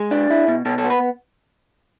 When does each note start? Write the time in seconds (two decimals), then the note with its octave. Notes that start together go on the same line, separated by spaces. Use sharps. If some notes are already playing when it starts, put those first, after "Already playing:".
Already playing: G#3 G#4
0.11 D4
0.30 E4
0.48 B2
0.65 B2 A4
0.78 A4
0.85 B3
0.90 B4